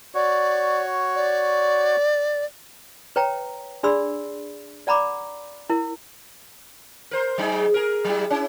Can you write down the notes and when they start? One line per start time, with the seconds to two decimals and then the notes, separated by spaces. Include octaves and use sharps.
0.15 F#4 C#5 D5
1.15 D5
3.16 B4 C#5 G5 A#5
3.83 D4 G#4 D5 B5 C6 E6
4.87 D5 F#5 A#5 B5 D6
5.70 E4 A#4
7.11 A#4 C5
7.38 F#3 D#4 G#4
7.74 G#4 A#4
8.04 F#3 G3 E4
8.30 C#4 E4